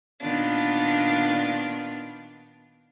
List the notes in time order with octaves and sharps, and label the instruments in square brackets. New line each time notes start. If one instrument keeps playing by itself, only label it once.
[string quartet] A#2 D#3 B3 D4 F4